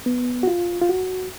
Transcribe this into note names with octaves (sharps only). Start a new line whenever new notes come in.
B3
F#4
F4
F4
F#4